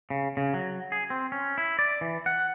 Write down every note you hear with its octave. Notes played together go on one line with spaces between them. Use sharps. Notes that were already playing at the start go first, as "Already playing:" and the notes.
C#3
C#3
F#3
G#4
C4
C#4
E4
D5
E3
F#5